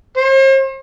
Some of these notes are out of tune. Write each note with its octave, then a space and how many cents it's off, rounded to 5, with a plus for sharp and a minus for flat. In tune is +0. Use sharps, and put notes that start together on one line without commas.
C5 +45